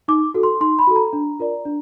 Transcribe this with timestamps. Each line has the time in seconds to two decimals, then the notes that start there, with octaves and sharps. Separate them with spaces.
0.08 D#4 D6
0.34 F#4 A4
0.43 C6
0.61 D#4 C6
0.79 B5
0.87 F#4 A4
0.96 A#5
1.13 D4
1.39 F4 A#4 D5
1.65 D4